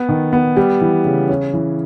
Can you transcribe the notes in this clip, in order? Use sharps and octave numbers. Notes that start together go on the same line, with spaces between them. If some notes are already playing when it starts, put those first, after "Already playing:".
Already playing: B3
D#3
B3
G3
E3
C#3
C#4
E3